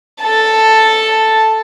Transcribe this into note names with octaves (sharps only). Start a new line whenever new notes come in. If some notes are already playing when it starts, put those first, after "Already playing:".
A4 A5